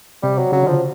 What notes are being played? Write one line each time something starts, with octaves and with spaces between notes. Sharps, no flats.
C3 G3
F#3
C#3 F#3
D3 F3
C#3